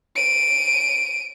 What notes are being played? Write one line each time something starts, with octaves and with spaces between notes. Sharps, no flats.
D7 D#7